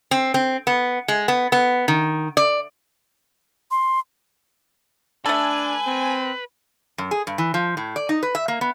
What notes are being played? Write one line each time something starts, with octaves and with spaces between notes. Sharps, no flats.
C4
C4
B3
G#3
B3
B3
D#3
D5
C6
A3 D4 A4 B4 G#5
C4
F#2
G#4
G2
E3
F3
A2
D5
D#4
B4
E5
A#3
B3